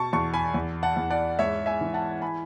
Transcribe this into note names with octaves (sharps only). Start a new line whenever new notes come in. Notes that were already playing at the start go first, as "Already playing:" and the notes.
Already playing: B2 A5 C#6
E2 A5 C#6
G#5 B5
E2
F#5 A5
E2
D5 F#5
G#2 C#5 E5
E5 G#5
E3
F#5 A5
G#5 B5